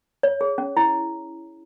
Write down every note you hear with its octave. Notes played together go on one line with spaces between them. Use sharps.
C#5
G#4
C#4
E4